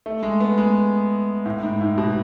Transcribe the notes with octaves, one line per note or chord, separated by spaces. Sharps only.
A3
G#3
B3
G#3
A2
G#2
A2
B2